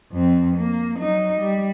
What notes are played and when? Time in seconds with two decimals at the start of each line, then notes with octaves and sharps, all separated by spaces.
0.12 F2 C4
0.57 A#3
0.98 F#3 D#4
1.40 G3